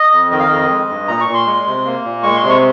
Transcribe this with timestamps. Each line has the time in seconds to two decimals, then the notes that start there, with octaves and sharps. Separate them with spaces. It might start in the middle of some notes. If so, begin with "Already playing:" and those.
Already playing: D#5
0.13 F2
0.31 D#3 D#5
0.40 F5
0.47 F2 D#5
0.70 G#3
0.89 G2
1.08 A#2 A#5
1.21 C#6
1.28 A#2
1.34 C6
1.47 G#3
1.66 C3
1.85 A#3
2.04 A#2
2.23 G#3 C#6
2.36 C6
2.42 C3
2.49 C#6